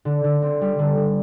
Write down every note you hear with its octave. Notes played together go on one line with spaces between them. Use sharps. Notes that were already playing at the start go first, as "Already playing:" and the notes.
D3
D3
C4
G3
D3
D3